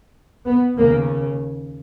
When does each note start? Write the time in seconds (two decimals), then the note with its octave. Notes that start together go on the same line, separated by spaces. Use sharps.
0.46 B3
0.77 D#2 C#3 A#3